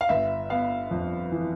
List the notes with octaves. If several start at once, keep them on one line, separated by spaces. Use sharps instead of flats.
F5
G1 E5
B3 F5
F2
E3